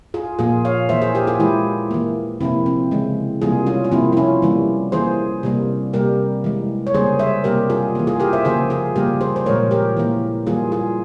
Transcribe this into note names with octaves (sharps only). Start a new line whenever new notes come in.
F4 G#4
A#2 F3 A#3 F4 G#4
C#5 F5
E3 A#3 C5 E5
G#4 C5
G4 A#4
F4 G#4
E3 G#3 E4 G4
E3 A#3
C3 F3 A#3 C4 E4
C4
C#3 E3 G#3
C3 E3 G3 A#3 F4 G#4
C#4 F4
F4
C3 F3 A#3 C4 E4
E4
C#4 F4
E3 G3 A#3
E3 A#3 G#4 C5
C3 G3 A#3
C3 G3 A#3 G4 A#4
E3 G#3
C#5
C#3 G3 A#3 G#4 C5
C5 E5
C3 G3 A#3 G4 A#4
F4 G#4
E3 A#3
F4 G#4
G4 A#4
C5 E5
C#3 F3 A#3 G#4 C5
F4 G#4
C#3 G3 A#3 G4 A#4
G#4 C5
C5
A#2 F3 G#3 A#4 C#5
G4 A#4
E3 A#3
E3 G3 A#3 F4 G#4
F4 G#4